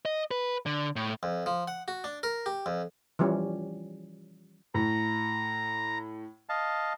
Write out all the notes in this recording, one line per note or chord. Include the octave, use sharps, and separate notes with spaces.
D#5
B4
D3
A2
F2
F3
F#5
F#4
D4
A#4
G4
F2
E3 F3 G3 C#4
A2 A#5
D#5 F5 A5